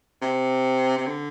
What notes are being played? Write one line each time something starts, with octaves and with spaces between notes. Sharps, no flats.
C3
C3
D3